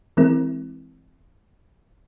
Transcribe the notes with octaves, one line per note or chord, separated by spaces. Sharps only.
E3 G#3 C4 E4 A#4